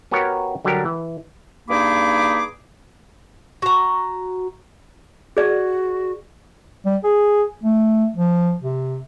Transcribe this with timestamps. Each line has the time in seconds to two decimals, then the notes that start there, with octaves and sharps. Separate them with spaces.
0.11 B3 F#4 G4 A#4 C#5
0.65 D3 F#3 G3 D4 G4 A#4
0.85 E3
1.69 G2 A#3 D#4 G#4 B5 D6
3.62 F#4 A#5
5.37 F#4 G#4 D5
6.86 G3
7.04 G#4
7.63 A3
8.16 F3
8.62 C3